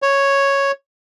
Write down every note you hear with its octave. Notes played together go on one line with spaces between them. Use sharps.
C#5